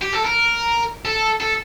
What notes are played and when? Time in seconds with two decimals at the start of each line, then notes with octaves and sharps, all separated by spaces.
0.02 G4
0.13 A4
0.25 A#4
1.05 A4
1.40 A4